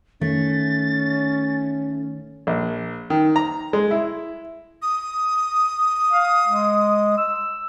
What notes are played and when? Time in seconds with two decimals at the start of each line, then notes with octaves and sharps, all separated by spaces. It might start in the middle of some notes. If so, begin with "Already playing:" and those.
0.21 D#3 A3 C#4 A6
2.47 A#1
3.10 D#3
3.36 A#5
3.73 G#3
3.91 E4
4.82 D#6
6.12 F5
6.47 G#3
7.18 E6